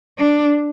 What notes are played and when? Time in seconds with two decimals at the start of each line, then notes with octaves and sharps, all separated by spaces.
0.18 D4